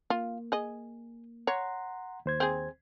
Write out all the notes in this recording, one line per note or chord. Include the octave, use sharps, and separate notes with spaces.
A#3 F4
G#4 D#5
C#5 F#5 A#5 C6
D#2 C5 G#6
C4 G#4